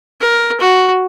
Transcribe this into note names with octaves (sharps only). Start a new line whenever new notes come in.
A#4
F#4